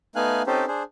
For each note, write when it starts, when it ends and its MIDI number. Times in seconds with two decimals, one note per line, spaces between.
0.16 0.42 57
0.16 0.42 59
0.16 0.42 63
0.16 0.42 77
0.16 0.42 80
0.16 0.42 90
0.47 0.65 60
0.47 0.65 61
0.47 0.65 63
0.47 0.65 67
0.47 0.65 69
0.47 0.65 72
0.68 0.83 62
0.68 0.83 68
0.68 0.83 72